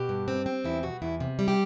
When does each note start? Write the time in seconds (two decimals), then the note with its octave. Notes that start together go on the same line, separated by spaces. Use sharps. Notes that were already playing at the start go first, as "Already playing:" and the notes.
Already playing: B2 G4
0.09 G2
0.28 C4
0.46 C4
0.64 E2 E4
0.83 B2 F#4
1.02 E2 E4
1.20 C3
1.39 G3
1.48 G4